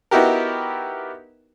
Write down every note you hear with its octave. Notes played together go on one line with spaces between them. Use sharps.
B3 D#4 E4 F#4 G4 A#4